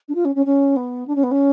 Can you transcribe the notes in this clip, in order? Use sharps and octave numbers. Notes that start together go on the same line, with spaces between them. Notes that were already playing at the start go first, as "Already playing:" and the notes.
D4
F4
C#4
C#4
C#4
B3
D4
C#4
B3
C#4